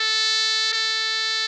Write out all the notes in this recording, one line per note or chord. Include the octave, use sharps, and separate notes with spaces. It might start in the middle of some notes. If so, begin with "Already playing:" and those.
Already playing: A4
A4